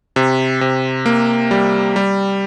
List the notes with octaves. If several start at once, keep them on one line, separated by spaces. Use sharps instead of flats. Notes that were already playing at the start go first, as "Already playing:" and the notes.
C3
C3
A#3
G3
G3